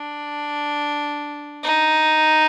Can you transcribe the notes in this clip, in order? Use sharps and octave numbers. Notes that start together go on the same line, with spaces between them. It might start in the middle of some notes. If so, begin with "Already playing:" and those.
Already playing: D4
D#4